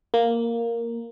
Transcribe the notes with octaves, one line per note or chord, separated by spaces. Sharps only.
A#3